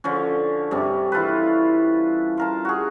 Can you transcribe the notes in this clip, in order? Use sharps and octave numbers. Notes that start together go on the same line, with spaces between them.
D3 F3 C#4
G2 C3 C#4
E3 F4 A4 B4
F4 A#4 A5
F#4 G#4